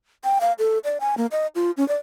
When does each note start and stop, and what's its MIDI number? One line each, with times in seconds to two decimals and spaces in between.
0.24 0.39 79
0.41 0.53 77
0.59 0.78 69
0.84 0.98 74
1.00 1.15 80
1.18 1.26 58
1.32 1.47 75
1.55 1.71 65
1.77 1.87 61
1.88 1.97 74